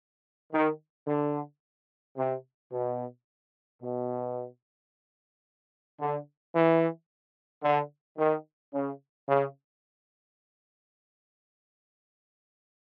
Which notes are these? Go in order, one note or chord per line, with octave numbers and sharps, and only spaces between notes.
D#3
D3
C3
B2
B2
D3
E3
D3
D#3
C#3
C#3